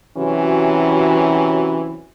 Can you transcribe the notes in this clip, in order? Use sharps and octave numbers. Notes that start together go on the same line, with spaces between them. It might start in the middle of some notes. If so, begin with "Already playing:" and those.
C3 E3 F#3 C#4 F#4